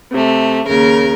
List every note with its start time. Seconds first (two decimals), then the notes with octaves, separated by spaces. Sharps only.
0.12 C3 A3
0.66 D#2 C#3 A#4